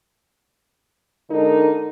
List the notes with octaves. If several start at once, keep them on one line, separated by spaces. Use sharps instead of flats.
D3 G#3 D#4 A4 A#4